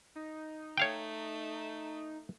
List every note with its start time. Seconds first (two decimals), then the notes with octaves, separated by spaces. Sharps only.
0.16 D#4
0.78 A3 C#5 F5 G5